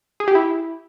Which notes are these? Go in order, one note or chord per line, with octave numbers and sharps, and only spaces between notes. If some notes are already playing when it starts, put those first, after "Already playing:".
G#4
G4
E4